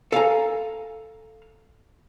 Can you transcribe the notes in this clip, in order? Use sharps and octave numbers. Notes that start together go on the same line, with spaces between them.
A4 F5 G#5 A#5